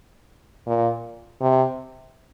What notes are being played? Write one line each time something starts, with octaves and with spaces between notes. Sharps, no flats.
A#2
C3